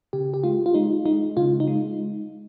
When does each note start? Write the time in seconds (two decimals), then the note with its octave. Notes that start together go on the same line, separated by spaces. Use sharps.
0.13 C#3 G4
0.34 G4
0.44 G#3 F4
0.66 F4
0.74 G#3 D#4
1.06 G#3 D#4
1.37 C#3 F4
1.60 D#4
1.68 G#3